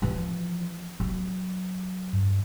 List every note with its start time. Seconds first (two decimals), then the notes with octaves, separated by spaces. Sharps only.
0.02 E3 F3
1.00 F#3
2.13 G2